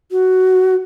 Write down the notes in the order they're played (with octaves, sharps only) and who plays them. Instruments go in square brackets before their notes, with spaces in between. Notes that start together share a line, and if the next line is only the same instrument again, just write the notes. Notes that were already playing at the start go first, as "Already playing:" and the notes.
[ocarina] F#4